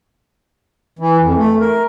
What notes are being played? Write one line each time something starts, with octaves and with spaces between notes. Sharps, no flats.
E3
F2
A3
A#4